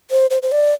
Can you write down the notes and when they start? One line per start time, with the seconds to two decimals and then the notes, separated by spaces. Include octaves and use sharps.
0.11 C5
0.30 C5
0.42 C5
0.52 D5